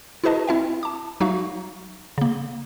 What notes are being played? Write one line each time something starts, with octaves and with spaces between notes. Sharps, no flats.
E4 F#4 G#4 B4 D#5 A5
C4 E4 E5 G5
A5 D6
F#3 D#4 F#4 E5 F5 C#6
C#3 A#3